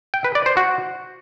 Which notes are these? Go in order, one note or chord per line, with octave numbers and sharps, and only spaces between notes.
G5
B4
D5
C5
F#4